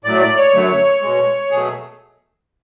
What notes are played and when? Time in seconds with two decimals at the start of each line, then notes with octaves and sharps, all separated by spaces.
0.04 A2 F#3 A3 D5
0.21 D5
0.37 C#5
0.53 F#2 D3 F#3 A3
1.02 B2 G#3
1.51 B2 F#3 A3 G#4